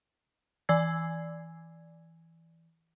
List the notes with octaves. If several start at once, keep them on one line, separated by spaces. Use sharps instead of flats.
E3 D5 G#5 E6 G#6 C7